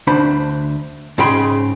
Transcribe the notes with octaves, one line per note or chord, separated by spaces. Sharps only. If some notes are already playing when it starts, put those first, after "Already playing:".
D2 D4 C5 B5
G#2 C#3 G#4 G5 B5 C6